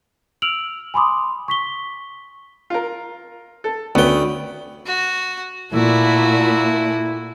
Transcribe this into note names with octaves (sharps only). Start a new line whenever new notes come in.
E6 F6 D7 F7 F#7
G#5 B5 C6 D6 D#6
C#6 B6 G7
F4 A#4
A4
D2 B3 C#4 B4 G5
F#4
A#2 A3 E4 F#4